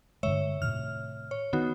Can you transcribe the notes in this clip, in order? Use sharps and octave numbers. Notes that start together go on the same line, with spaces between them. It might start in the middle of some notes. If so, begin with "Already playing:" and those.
G2 D3 G#3 C#5 E5
A2 C3 D#3 F6
C#5
D#3 B3 D#4 F#4